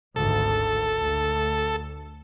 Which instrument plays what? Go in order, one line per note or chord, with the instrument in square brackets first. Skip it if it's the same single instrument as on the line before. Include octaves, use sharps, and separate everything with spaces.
[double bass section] G#1 D2 [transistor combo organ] A4
[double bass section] D2